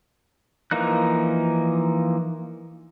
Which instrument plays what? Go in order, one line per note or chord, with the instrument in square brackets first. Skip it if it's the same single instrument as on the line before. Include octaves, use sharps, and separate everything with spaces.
[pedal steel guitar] E3 F3 A#3 D#4 F#6